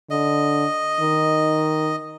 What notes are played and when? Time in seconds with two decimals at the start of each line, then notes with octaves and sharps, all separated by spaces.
0.10 D3 D#5
1.01 D#3